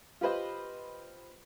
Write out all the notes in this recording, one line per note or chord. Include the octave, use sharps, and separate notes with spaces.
F4 G4 B4 C5 D#5